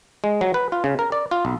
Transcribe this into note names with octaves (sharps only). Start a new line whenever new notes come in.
G#3
F#3
B4
F4
C#3
A#4
D5
F4
B1